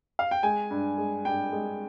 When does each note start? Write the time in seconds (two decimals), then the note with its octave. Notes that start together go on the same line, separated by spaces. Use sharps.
0.19 F5
0.31 G5
0.43 G#3 G#5
0.71 G2
0.98 G#3
1.25 G2 G5
1.53 G#3